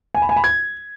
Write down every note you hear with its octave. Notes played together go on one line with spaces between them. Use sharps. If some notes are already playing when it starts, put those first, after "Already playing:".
G#5
B5
G#5
B5
G#6